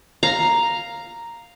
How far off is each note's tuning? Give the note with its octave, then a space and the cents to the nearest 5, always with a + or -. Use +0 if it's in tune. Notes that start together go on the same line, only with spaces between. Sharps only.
F5 +0 A#5 +0